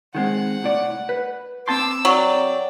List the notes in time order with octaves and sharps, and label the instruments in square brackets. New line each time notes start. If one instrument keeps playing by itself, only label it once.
[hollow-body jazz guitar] D#3 G#3 C4 [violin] F#5
[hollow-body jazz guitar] C2 A2 D5
B4
[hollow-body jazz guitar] C4 A5 C6 [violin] D6 E6
[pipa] F#3 [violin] D5 G5